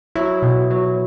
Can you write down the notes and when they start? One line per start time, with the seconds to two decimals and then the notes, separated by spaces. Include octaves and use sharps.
0.16 F#3 E4
0.42 B2
0.71 F#3